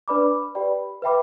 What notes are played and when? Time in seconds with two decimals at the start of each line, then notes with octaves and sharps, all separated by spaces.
0.08 D4 B4 D5 B5 D6
0.55 G4 B4 D5 G5 B5
1.02 B4 E5 G5 B5 D6